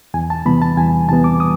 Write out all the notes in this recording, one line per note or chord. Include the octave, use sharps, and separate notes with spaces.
E2 G#5
A5
C3 E3 G3 B3 B5
A5
E2 G#5
C3 E3 G3 B3 A5
D6
D#6